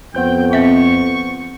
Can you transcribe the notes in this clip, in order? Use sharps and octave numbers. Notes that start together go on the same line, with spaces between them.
F2 B3 C5 G5 G6
C4 E5 C#6